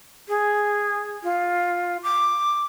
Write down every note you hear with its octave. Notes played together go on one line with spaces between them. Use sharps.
G#4
F4
D6